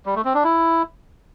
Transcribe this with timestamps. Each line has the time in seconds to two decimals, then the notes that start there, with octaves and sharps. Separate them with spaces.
0.06 G3
0.15 A3
0.25 C4
0.34 D4
0.44 E4